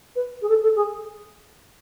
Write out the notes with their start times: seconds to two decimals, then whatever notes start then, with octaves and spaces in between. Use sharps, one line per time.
0.15 B4
0.41 G#4
0.48 A4
0.62 A4
0.75 G#4